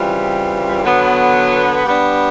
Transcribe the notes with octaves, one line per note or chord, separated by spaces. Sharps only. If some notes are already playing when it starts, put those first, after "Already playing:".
Already playing: C#3 E3 G3 C4 F4
D3 F#3 B3
G3 B3 D4